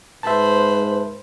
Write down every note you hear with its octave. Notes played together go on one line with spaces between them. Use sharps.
G#2 B4 C5 E5 A5 B5